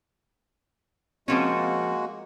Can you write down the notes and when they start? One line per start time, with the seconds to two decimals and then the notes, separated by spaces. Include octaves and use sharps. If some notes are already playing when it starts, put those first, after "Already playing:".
1.28 F3 G#3 A#3 C4 C#4 F#4